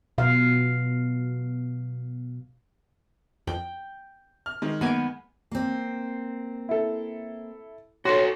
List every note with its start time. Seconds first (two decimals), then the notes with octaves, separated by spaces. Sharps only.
0.18 B2 F5
3.47 F2 G5
4.46 F6
4.62 D#3 G#3
4.81 F#2 A#3 B3 G#5 D7
5.52 A#3 C4
6.69 E4 A4
8.05 F#4 A4 C#5 C6